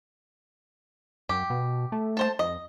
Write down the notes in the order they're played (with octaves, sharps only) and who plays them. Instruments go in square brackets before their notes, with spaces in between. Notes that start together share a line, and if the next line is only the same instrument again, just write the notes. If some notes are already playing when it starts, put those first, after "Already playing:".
[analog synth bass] F#2 [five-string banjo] G4
[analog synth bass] B2
A3
[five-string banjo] A4 C5 A5
[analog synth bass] F2 [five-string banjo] D#5